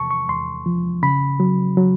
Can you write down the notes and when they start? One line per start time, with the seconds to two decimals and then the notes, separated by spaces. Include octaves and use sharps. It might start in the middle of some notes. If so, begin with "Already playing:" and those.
Already playing: E2 C3 A5 C#6
0.11 C#6
0.29 E2 C6
0.66 F3
1.03 C#3 B5
1.40 F#3
1.77 F#3